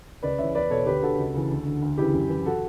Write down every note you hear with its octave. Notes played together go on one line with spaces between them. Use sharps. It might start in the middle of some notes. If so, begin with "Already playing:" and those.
C#2 B4 D5
C#3 E3 C#5 E5
E2 B4 D5
B2 A4 C#5
D2 G4 B4
D3 F#4 A4
C#2
C#3 E3
D2
D3
D2
C#3 E3 E4 G4
F#2
E3
F#4 A4